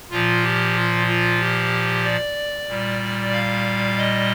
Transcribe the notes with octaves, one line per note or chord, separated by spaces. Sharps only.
A#2 F3 F4
G4
F4
F4
G4
D5
A#2 G3
F5
D#5